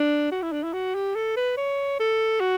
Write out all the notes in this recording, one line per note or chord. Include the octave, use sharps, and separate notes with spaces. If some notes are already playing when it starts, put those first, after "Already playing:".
Already playing: D4
F#4
E4
D4
E4
F#4
G4
A4
B4
C#5
A4
F#4